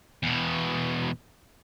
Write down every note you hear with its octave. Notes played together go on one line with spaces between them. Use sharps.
E2 B2